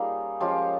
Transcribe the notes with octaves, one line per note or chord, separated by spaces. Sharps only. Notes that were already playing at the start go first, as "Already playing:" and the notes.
Already playing: G3 A#3 C#4 D#4 F4 G#4
F3 G#3 C#4 F4 G4